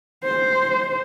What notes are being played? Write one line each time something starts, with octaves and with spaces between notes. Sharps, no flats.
C5